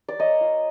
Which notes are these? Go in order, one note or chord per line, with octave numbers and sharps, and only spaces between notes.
D5
A#3 C#5 D#5
F4